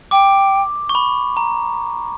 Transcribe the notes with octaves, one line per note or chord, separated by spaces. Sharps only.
G5 D6
C#6
B5
A#5